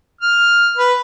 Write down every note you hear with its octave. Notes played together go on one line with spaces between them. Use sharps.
F6
B4